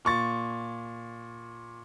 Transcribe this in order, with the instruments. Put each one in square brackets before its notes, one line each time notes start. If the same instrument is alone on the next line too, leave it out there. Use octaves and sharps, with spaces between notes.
[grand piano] A#2 C#6 A6